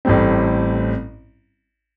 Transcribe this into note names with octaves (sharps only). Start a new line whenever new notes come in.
A1 A2 G3 C4